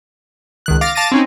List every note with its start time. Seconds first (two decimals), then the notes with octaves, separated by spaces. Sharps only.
0.66 C#2 D#3 F#6
0.81 F5 D6 A6 A#6
0.95 F5 A5 D6 A6 A#6 D#7
1.12 C4 C#4 D#4